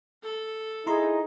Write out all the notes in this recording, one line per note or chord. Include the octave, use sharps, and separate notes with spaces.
A4
D#4 E4 G#4 A#5 C6